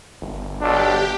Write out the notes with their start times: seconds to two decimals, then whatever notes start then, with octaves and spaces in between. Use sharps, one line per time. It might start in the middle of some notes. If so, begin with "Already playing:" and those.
0.22 G1
0.61 B1 D4 G4